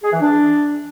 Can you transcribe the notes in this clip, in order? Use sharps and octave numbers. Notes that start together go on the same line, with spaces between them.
G#4
E3
D4